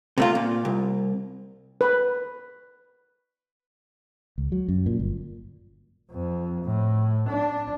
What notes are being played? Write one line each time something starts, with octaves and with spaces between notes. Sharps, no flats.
C3 A3 F4
A#2
C2
B4
C#2
F#3
F#2
A#2
G1
F2
A2
D4